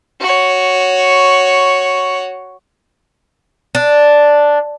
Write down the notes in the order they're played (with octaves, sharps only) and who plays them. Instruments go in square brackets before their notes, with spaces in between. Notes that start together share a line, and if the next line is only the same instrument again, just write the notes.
[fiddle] F#4 C#5
[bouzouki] D4